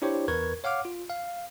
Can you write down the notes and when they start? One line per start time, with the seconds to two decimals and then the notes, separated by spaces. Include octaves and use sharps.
0.02 D4 E4 G4 C5 C#5
0.28 E2 A#4 B4 C#6 G#6
0.64 C#5 F5 F#5 D6 F6
0.85 F4
1.10 F5